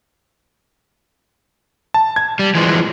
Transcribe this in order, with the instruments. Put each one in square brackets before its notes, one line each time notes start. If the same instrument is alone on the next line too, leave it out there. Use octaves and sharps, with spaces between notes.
[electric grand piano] A5
G#6
[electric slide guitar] G3
E3 F3 G#3